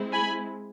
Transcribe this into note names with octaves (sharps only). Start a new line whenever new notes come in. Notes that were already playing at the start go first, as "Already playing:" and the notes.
Already playing: G#3 C4 E4
G#5 B5